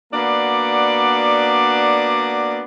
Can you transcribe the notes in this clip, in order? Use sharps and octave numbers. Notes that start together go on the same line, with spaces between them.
A#3 B3 D4 F#4 D5